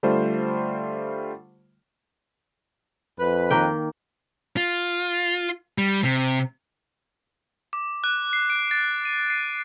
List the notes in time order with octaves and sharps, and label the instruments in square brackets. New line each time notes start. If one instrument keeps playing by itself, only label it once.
[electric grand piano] D3 G3 A3 F4 C5
[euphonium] F2 [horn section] B4
[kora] D#3 A#3 G5
[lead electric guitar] F4
G3
C3
[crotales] D6
F#6
C7
D7
A6
D#7
C7